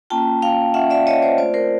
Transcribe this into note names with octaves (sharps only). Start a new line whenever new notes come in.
A#3 C#4 F4 G5 A5
F5 G5
A#3 C#4 F4 E5 F#5
D5 E5
C#5 D#5
C5 D5
A3 C4 F4 C5 D5
A#4 C5